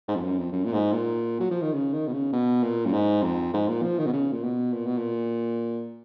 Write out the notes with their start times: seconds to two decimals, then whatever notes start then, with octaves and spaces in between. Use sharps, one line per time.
0.08 G#2
0.16 F2
0.23 F#2
0.38 F2
0.52 F#2
0.65 A#2
0.73 G#2
0.92 A#2
1.40 F#3
1.51 F3
1.62 D#3
1.73 C#3
1.93 D#3
2.07 B2
2.13 C#3
2.33 B2
2.63 A#2
2.86 F#2
2.93 G#2
3.23 F2
3.54 G#2
3.68 A#2
3.83 F3
3.99 D#3
4.06 B2
4.13 C#3
4.32 A#2
4.43 B2
4.73 A#2
4.86 B2
4.98 A#2